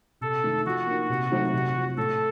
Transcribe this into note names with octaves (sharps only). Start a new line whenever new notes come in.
C3 A4
D#3 A3 D#4
F3 F#4
A#3 D#4
C3
F#3 A3 C4 D#4
C3
F3 C4
A2 A4